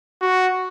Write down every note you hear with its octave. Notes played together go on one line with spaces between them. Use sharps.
F#4